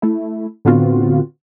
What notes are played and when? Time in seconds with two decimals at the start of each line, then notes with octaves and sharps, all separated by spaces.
0.02 A3 E4
0.65 A2 D3 B3 C4 F4 F#4